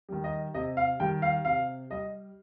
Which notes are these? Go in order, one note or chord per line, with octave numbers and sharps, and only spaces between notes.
D#3 G3
D#5
C3 D#5
F5
D#3 G3 G5
F5
C3 F5
G3 D#5